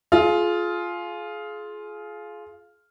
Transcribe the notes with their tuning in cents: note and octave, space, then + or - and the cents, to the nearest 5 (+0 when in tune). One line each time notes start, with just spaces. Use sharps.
F4 +0 G#4 +30